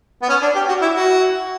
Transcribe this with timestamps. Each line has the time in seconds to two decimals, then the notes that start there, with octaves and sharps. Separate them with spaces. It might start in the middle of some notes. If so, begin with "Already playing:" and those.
0.22 B3
0.29 C#4
0.42 D4
0.55 G4
0.68 F#4
0.82 E4
0.95 F#4